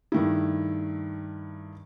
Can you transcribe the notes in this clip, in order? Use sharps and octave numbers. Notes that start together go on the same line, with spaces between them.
G2 D#3 A3 E4